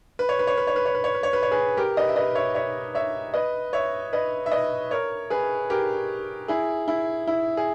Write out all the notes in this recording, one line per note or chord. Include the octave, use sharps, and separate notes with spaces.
B4
C#5
B4
C#5
B4
C#5
B4
C#5
B4
C#5
B4
C#5
B4
C#5
G#4 B4
G4 A#4
B4 D#5
E5
B4 D#5
C#5 E5
C#5 E5
C#5 E5
B4 D#5
C#5 E5
B4 D#5
E5
B4 D#5
A#4 C#5
G#4 B4
G4 A#4
E4 G#4
E4
E4
G#4